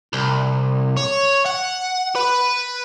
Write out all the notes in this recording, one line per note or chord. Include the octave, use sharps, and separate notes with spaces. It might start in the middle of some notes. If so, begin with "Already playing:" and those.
C2
C#5
F#5
B4